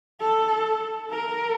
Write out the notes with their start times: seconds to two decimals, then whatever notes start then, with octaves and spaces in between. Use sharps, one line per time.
0.20 A4
1.10 A#4